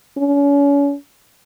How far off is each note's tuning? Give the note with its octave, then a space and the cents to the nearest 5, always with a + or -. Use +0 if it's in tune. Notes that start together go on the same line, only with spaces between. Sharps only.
C#4 +35